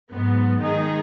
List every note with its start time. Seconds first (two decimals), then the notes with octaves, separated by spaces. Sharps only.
0.11 G#2 F#3 B3
0.61 D#3 G#3 D#4 G#4